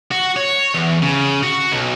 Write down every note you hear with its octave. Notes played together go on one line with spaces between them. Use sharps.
F#4
C#5
E2
C#3
F#4
B1